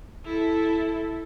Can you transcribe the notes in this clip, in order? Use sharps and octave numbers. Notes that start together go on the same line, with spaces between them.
E4 A4